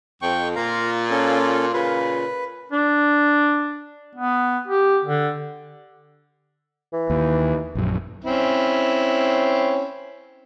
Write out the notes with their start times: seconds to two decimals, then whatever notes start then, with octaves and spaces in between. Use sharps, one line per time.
0.22 F2 G5 C#6
0.56 A#2 F4 F5 A#5
1.11 C#4 A4
1.73 A#2 C#3 F4 B4
2.72 D4
4.15 B3
4.68 G4
5.05 D3
6.93 E3
7.10 D#2
7.75 A#1 F#2
8.24 C4 C#4 E4